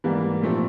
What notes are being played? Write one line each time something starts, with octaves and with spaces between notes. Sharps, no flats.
G#2 E3 G3 A#3
A#2 F3 A3 C4